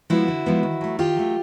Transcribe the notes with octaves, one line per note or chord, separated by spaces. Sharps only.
F3 G#3 B3 E4 F#4
D3
F3 G#3 B3
D#3
F#3 A3
D#3 F4 G4
F#3 A3